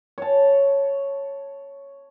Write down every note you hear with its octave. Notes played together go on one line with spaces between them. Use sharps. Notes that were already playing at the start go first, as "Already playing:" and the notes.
C#5 A5